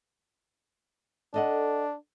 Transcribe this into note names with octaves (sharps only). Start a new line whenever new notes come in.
D4 A4 D#5 F#5